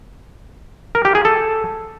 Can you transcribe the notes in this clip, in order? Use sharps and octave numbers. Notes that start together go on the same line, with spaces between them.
A#4
G4
G#4
A4